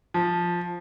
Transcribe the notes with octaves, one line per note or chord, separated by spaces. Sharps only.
F3